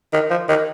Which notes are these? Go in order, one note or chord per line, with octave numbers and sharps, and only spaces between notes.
D#3
F3
D#3